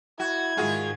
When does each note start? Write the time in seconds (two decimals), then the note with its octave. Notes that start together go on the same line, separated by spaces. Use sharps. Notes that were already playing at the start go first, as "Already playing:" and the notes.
0.20 E4 F#4 G#6
0.57 G#2 D#3 F4 F#4 G#4